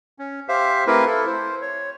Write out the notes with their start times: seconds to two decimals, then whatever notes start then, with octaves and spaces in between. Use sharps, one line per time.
0.19 C#4
0.49 G4 C5 E5 F5
0.87 A3 C4 E4 G4 A#4 B4
1.06 E4 A4
1.27 C5
1.62 C#5